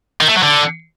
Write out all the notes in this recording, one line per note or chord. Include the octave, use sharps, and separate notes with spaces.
D#3
A3
F#3
D3